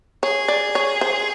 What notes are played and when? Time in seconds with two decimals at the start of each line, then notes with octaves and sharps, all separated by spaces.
0.23 G#4 C#5
0.48 D5
0.75 C#5
1.01 C5